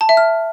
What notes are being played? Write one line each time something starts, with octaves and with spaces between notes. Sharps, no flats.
A5
E5
F6